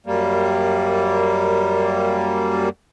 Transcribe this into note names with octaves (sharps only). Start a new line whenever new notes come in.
F#2 G3 A#3